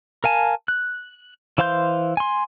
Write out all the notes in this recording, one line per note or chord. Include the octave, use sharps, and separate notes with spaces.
A#4 F5 G#5 A5
F#6
E3 C5 F5 C6 G6
G#5 C6